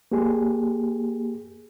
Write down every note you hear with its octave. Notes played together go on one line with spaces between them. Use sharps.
A#3 G4 G#4